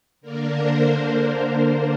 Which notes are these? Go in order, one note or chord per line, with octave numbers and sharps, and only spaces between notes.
D3 A#3 D4 A#4
C5